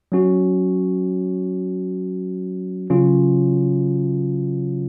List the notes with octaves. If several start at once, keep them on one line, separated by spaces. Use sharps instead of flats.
F#3 C#4 F#4
C#3 F#3 C#4 F4